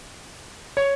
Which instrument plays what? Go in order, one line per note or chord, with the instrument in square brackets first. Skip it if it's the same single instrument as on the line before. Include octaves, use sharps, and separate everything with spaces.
[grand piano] C#5